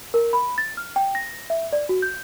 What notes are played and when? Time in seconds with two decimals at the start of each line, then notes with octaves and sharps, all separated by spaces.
0.14 A#4
0.33 B5
0.58 A6
0.77 F6
0.96 G5
1.15 A#6
1.50 E5
1.73 D5
1.89 F#4
2.02 G6